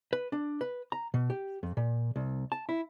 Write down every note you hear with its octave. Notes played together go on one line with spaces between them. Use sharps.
B4
D4
B4
A#5
B2
G4
F2
A#2
C2
A5
E4